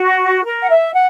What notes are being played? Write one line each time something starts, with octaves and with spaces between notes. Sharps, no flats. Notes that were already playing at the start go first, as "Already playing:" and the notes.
Already playing: F#4
A#4
F#5
E5
F#5